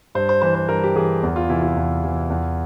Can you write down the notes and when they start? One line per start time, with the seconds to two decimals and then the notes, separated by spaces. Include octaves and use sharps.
0.15 G2 C5
0.29 C5
0.42 E3 C5
0.55 C5
0.69 G2 A#4
0.83 G4
0.96 E3 G#4
1.23 E2
1.36 F4
1.49 C3 E3 E4
1.63 F4
1.77 E2
2.03 C3 E3
2.30 E2